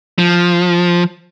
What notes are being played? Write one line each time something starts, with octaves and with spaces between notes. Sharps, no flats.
F3